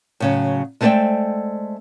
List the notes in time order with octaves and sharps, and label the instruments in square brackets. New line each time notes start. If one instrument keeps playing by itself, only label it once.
[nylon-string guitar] A2 C#3 F#3
G#3 A3 C4 C5 D5 G5